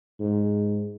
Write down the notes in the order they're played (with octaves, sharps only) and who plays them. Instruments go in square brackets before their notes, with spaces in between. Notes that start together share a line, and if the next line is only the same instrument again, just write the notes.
[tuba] G#2